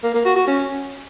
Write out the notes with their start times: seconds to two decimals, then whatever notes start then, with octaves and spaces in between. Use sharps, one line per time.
0.03 A#3
0.14 A#3
0.25 F#4
0.36 F#4
0.47 C#4